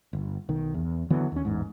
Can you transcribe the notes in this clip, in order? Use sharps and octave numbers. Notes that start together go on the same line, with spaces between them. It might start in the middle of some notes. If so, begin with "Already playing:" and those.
G1
B1 D#3
E2
D3 E3 F#3 B3
D#2 C#4
A1 E2 G#2